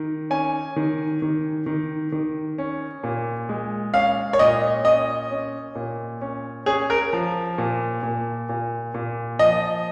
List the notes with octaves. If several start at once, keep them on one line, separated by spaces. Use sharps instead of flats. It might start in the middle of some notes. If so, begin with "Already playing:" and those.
Already playing: D#3
C#4 G#5
D#3
D#3
D#3
D#3
C#4
A#2
G#3
C#4 F5
C#5
A#2 D#5
C#4 D#5
C#4
A#2
C#4
C#4 G#4
A#4
F3
A#2
A#2
A#2
A#2
F3 D#5